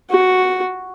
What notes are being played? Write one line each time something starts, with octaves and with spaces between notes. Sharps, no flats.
F#4